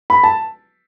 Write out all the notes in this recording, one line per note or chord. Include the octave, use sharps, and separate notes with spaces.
B5
A5